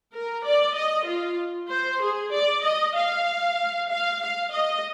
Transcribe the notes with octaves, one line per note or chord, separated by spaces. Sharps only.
A#4
D5
D#5
F4
C5
G#4
D5
D#5
F5
F5
F5
D#5